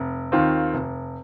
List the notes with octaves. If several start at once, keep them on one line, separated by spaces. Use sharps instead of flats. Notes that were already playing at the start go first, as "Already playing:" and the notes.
Already playing: F1
D#2 D#3 C4 F4
F1